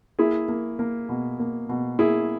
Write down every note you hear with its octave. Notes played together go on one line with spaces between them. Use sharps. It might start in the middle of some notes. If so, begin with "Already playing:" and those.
A#3 E4 G#4
A#3
A#3
B2
A#3
B2
A#3 E4 G#4